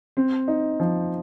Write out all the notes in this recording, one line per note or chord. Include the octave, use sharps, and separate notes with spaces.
C4
D#4
F3